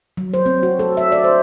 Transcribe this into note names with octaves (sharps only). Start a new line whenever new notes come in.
F#3
C5
C4
F#4
A4
E5
D5
C5